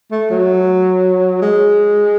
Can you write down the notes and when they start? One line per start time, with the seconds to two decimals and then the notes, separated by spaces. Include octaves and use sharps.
0.11 A3
0.30 F#3
1.42 G#3